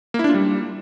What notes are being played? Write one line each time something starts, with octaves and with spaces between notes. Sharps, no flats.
A#3
E4
D4
F4
G3